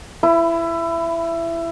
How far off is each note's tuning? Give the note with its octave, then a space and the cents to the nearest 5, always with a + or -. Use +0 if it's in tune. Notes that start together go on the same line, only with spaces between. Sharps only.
E4 +20 B4 +5